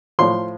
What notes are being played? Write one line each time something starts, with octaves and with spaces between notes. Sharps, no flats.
A2 F3 C6